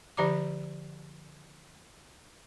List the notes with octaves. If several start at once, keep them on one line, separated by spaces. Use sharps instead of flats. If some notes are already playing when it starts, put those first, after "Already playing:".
D3 F3 G4 D5 A#5 D6